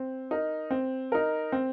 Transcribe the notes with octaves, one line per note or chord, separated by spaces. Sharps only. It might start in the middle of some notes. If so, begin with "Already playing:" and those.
Already playing: C4
D#4 A#4
C4
D#4 A#4
C4